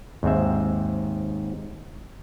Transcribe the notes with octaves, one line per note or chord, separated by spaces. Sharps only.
D#2 G#2 C4 E5